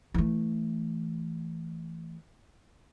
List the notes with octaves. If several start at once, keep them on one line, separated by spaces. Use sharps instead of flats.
E3 A3